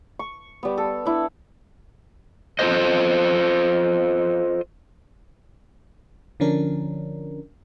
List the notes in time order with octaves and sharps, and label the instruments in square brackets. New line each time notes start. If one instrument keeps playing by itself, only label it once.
[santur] C#6
G3 B3
A4
D4 E4
[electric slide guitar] F4 A4 B4 C5 D#5
[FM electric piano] D3 F3 C#4 D4 A#4